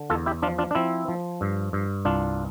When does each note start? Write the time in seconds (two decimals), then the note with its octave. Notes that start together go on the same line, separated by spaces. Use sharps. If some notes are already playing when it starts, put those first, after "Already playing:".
Already playing: D3
0.10 E2 F4 A4
0.26 E4 G4
0.42 F3 D4 F4
0.58 D4 F4
0.71 D4
0.75 F3 C4 E4
1.08 F3
1.41 G2
1.73 G2
2.05 C2 D4 F4